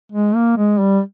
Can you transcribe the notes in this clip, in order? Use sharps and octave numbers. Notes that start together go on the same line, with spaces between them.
G#3
A#3
G#3
G3